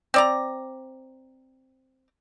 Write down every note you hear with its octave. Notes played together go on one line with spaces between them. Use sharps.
C4 D5 A#5